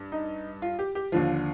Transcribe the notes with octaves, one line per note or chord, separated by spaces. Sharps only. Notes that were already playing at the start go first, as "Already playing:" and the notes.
Already playing: G2
D#4
F4
G4
G4
D#2 D3 F3 F4